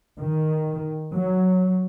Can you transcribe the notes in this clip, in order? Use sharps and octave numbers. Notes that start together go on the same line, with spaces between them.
D#3
F#3